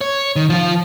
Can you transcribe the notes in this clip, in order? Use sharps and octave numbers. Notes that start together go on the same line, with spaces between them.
C#5
D#3
F3 F4